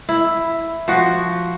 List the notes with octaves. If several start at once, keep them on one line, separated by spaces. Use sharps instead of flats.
E4
F3 F#4